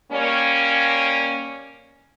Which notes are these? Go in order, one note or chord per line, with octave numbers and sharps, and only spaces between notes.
G3 A#3 C#4